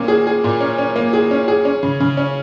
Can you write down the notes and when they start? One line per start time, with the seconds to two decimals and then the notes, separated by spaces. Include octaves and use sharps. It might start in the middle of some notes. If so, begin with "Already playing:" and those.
Already playing: A#2 A#3 C#4
0.08 G#4
0.27 G#4
0.44 A#2
0.61 C#4
0.78 C#4
0.96 A#3
1.13 G#4
1.31 C#4
1.48 G#4
1.65 C#4
1.83 C#3
2.00 C#3
2.17 C#4